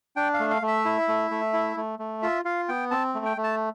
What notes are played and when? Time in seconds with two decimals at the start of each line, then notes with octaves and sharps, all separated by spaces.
0.16 D4 G5
0.34 F5
0.40 A3
0.51 F5
0.62 A3
0.67 E5
0.85 E4
1.08 A3
1.31 A3
1.53 E4
1.77 A3
1.99 A3
2.22 F4 E5
2.45 F4 F5
2.69 B3 G5
2.91 C4 A5
3.15 A3
3.25 G5
3.37 A3
3.43 A5